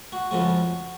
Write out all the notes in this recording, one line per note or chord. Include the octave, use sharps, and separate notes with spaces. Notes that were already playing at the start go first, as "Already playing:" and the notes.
F#4
F2 C#3 F3 G#3 F#4